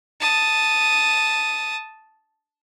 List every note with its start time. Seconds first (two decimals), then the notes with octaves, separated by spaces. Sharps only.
0.20 A5 D#6